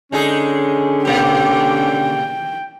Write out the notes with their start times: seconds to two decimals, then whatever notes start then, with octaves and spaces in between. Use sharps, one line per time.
0.12 D3 G#3 C#4 D#4 G#4
1.05 B2 A#3 G4 G5